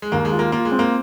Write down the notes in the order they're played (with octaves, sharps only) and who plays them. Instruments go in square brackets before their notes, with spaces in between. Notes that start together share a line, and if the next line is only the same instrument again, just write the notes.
[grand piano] G#3
[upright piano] D#2 [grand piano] A#3
[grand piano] G#3
[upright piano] F4
[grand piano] A#3
[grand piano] A#3 [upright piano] F4
[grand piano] G#3
[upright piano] C4
[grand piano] A#3